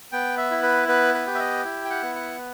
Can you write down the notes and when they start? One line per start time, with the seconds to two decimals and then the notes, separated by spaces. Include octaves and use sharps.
0.12 B3 G5
0.37 E5
0.51 E4
0.63 B4
0.88 B3 B4
1.14 B4
1.27 G4
1.35 E5
1.39 D#5
1.65 E4
1.85 G5
1.90 F#5
2.03 B3
2.15 F#5